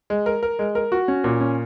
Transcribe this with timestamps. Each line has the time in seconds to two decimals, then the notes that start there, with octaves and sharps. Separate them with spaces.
0.10 G#3
0.26 A#4
0.43 A#4
0.59 G#3
0.75 A#4
0.92 F#4
1.08 C#4
1.24 A#2
1.41 C#4